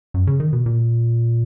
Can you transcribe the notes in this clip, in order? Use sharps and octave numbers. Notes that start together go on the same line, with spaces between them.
F#2
C#3
D#3
B2
A#2